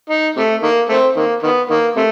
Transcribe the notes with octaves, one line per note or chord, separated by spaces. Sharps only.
D#4
C3 A3
D#3 A#3
A3 C4
D#3 A#3
D#3 B3
D#3 A#3
C3 A3